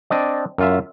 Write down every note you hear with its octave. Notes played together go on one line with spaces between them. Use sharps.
C4 D4 D5 D#5
F#2 F4 E5